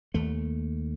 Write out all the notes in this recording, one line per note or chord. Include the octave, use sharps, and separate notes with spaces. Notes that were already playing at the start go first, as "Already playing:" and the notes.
D#2 A3